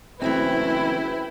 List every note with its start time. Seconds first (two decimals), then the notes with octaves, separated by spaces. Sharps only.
0.22 F#1 E3 A3 C4 E4 B4 G5